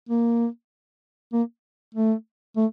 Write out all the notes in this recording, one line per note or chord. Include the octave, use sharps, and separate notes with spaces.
A#3
A#3
A3
A3